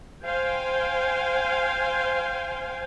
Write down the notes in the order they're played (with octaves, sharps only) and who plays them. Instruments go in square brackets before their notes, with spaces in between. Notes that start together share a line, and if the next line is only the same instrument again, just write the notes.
[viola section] C5 F5 G5 G#5